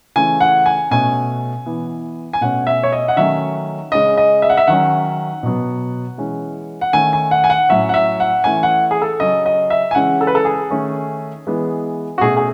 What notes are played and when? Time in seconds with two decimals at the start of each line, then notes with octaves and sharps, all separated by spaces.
0.16 C#3 E3 A3 C#4 G#5
0.40 F#5
0.66 G#5
0.91 B2 A3 C#4 G#5
1.66 E3 B3
2.33 G#5
2.41 B2 A3 C#4 F#5
2.67 E5
2.83 C#5
2.92 D#5
3.08 F#5
3.16 D#3 F#3 A3 C#4 E5
3.92 C#3 G#3 C#4 D#5
4.17 D#5
4.42 E5
4.49 F#5
4.57 E5
4.67 D#3 F#3 C#4 F#5
5.43 B2 F#3 B3
6.18 E3 G#3 C#4
6.81 F#5
6.93 D#3 A3 C#4 G#5
7.13 G#5
7.31 F#5
7.44 G#5
7.50 F#5
7.69 A2 F#3 C#4 E5
7.89 F#5
7.94 E5
8.20 F#5
8.44 E3 A3 C#4 G#5
8.63 F#5
8.91 G#4
9.02 A4
9.20 C#3 F#3 C#4 D#5
9.46 D#5
9.70 E5
9.91 G#5
9.95 C#3 E3 G#3 C#4 F#5
10.21 A4
10.27 B4
10.35 A4
10.45 G#4
10.71 D#3 A3 C#4
11.47 E3 G#3 B3
12.18 F#4
12.21 B2 A3 C#4 G#4
12.37 G#4